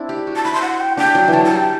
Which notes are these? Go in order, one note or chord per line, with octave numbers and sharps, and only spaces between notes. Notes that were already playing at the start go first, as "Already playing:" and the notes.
Already playing: C4 D4 E4
G4
F#4
A5
E4 B5
C6
F#5
G5
D4 G5
F#3
E3
F#3 A5
A5
G3
G5